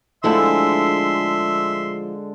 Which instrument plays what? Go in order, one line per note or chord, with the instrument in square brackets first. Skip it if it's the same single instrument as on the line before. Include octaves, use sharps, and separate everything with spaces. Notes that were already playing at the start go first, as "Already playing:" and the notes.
[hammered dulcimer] D3 G#3 A4 [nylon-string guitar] F3 A3 E4 [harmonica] E5 C6